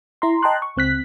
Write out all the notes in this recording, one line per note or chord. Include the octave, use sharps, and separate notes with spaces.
E4 A#5 C6
D#5 G5 A5 A#5 C6 F#6
C#6
C#2 C4 F#6 B6